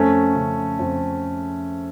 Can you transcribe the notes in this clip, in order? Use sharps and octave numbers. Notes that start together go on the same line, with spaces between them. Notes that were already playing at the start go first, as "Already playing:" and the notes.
Already playing: F2 A3 C#4
C#3
F2